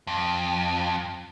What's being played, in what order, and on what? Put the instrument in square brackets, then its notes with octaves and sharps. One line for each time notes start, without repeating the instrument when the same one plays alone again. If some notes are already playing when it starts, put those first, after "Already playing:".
[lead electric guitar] F2